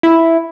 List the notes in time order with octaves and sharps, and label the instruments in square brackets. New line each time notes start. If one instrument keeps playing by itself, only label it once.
[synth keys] E4